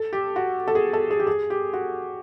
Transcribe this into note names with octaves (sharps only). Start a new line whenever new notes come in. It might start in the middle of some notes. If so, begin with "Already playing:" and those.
Already playing: A4
G4
F#4
A4
G#4
A4
G#4
G4
G#4
G4
F#4